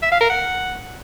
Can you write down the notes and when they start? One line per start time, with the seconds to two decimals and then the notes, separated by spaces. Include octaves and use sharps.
0.03 E5
0.12 F5
0.21 A#4
0.30 F#5